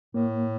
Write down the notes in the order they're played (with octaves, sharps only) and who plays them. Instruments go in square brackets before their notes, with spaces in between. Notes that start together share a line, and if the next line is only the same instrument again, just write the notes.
[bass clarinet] A2 [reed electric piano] A#3